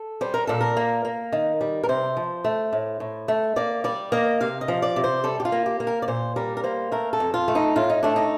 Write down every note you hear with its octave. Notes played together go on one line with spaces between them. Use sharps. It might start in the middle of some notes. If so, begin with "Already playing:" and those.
Already playing: A4
G3 C5
A#4
A#2 A4
A#4
A#3
A#3
D#3
G3
A#4
C3 C5
F3
A3
A2
A2
A3
A#3 D5
G3 D5
A#3 D#5
C3 F5
D#5
F3
D5
C3
C5
G3 A4
G4
F4
A#3
G4
A#3
A#4
D5
A#2 C5
G3 A#4
A#4
A#3 C5
A3 A#4
A4
F2
F4
A3
D#4
A2 F4
D#4
A3 D4
D#4